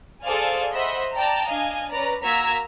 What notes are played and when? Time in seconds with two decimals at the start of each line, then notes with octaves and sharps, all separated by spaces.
0.24 G#4 A4 C5 D5 F5 G#5
0.73 C5 D#5 E5 F#5 B5
1.12 D5 G5 A5 A#5
1.48 D4 D#5 F5 G#5
1.91 C#4 B4 D5 A#5
2.23 A#3 F#4 A#5 E6 G#6 B6